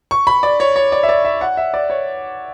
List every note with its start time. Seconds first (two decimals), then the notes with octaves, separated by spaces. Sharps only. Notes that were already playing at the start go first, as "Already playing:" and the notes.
0.11 C#6
0.27 B5
0.43 D5
0.60 C#5
0.76 C#5
0.92 D5
1.03 E5
1.09 D5
1.25 E5
1.41 F#5
1.57 E5
1.74 D5
1.90 C#5